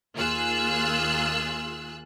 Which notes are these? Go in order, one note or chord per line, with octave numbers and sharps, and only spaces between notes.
D#2 A#3 F4 G#4 E6 F#6